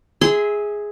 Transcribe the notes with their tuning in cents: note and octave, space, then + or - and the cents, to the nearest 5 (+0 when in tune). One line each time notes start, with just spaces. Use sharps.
G#4 +0 E5 -25 C6 -25